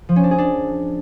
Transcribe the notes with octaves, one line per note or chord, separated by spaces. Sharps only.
F3
C#4
D4
G#4
D4